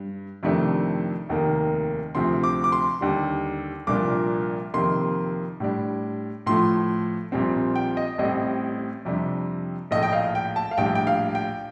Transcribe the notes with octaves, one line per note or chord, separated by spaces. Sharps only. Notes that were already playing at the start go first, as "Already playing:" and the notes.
Already playing: G2
F2 C3 D#3 A3 D4
F1 D#2 D#3 A#3
D2 C3 F3 C4 C6
D6
D6
C6
D#2 D3 G3
C2 A#2 F3 A#3 D4 D6
F2 C3 D#3 A#3 C6
A2 G3 D4
A2 F3 A3 C6
A#1 A#2 G3 C4
G5
D#5
A1 A2 G3 C4 D#5
F2 C3 G3 D4
A#1 A2 A3 D#5
G5
F5
G5
A5
F5
A#1 A2 G3 D4 G5
G5
F5
G5